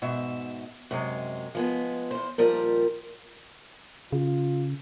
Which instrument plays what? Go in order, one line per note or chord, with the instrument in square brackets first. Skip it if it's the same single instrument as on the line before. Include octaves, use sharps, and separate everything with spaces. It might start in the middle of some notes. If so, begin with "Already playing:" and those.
[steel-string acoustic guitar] G#2 B2 E5
F#2 C3 G#3
F3 G#3 B3
E2 C5
D#2 A#2 F3 G3 A#4
[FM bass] C#3 [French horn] F4